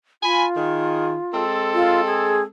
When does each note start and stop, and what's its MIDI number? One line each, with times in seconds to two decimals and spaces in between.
0.23 1.43 65
0.23 0.45 80
0.23 0.45 83
0.56 1.15 51
0.56 1.15 68
1.32 2.46 56
1.32 2.46 60
1.32 2.46 69
1.74 2.01 65
2.06 2.41 68